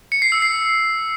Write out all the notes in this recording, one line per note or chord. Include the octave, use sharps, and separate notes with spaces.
C#7
C7
E6
C7